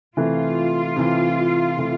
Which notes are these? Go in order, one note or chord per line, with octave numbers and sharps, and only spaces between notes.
C3 E3 A3 F4
C3 E3 A3
C3 E3 A3